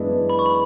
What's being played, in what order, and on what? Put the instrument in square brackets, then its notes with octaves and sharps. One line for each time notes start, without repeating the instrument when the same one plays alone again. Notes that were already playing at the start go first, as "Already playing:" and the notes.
Already playing: [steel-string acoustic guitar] F#2 E3 G#3 B3 D4
[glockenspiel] B5
C#6
B5